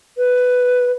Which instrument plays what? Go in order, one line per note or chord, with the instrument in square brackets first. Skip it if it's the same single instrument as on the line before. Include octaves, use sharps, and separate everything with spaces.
[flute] B4